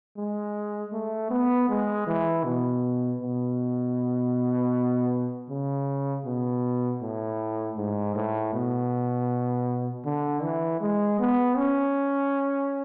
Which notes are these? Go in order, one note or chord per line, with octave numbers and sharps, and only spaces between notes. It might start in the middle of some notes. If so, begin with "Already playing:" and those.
G#3
A3
B3
G#3
E3
B2
B2
C#3
B2
A2
G#2
A2
B2
D3
E3
G#3
B3
C#4